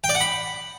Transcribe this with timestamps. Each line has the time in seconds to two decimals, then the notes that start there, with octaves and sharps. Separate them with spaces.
0.04 G5
0.09 D5
0.15 F#5
0.20 B5